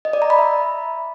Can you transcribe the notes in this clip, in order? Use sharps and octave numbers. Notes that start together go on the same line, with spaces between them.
D#5
D5
A#5
B5
E5